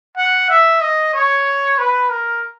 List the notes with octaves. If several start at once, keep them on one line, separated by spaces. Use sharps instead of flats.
F#5
E5
D#5
C#5
B4
A#4